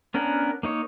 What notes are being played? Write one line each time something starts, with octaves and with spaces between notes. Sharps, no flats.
B3 C#4 D4 A#4 F#5
A#3 D#4 C#5